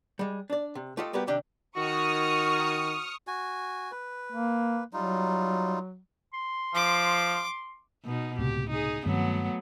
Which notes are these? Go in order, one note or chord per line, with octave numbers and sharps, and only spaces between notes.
G3 G#3
D4 D5
C3
A3 F4 G4 A4 D#5
G3 A#3 B3 F#4 G4
C3 D#3 D4 G4 G5
D#3 F#4 C#6 D#6 F6
F#4 G#5
B4
A#3
F#3 G3 D#4 F4
C6
F3 D6
B2 D#4
C#2 A2 C3 G4
D#4 G#4
G2 D#3 F#3 A3 B3 C4